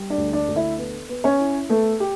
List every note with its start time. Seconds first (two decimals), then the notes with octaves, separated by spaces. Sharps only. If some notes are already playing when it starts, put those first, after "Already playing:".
Already playing: G3
0.10 D4 D5
0.18 D2
0.33 D4 D5
0.48 D2
0.56 E4 E5
0.79 B3
1.09 B3
1.24 C#4 C#5
1.40 E4
1.69 A3 B3 A4
2.00 G4